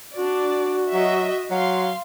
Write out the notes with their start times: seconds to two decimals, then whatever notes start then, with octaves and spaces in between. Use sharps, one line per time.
0.17 D4 F#4 D5
0.93 F#3 D#5 E5
1.50 F#3 F5 C6